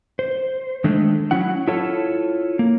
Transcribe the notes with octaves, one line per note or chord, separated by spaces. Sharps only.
C5
D#3 G#3 A3 D4
F#3 C#4 E4 F#5
E4 F4 A4 C#5
A#3